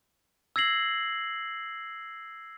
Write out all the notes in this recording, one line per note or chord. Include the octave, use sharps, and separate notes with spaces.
E6 G#6 A#6 C7 F#7